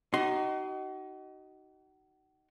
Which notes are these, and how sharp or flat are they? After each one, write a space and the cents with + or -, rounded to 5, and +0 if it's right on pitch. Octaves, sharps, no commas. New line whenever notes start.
D#4 +0 F#4 +40 C6 +0